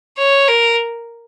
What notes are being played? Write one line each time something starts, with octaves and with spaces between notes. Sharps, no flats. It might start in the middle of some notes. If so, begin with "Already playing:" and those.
C#5
A#4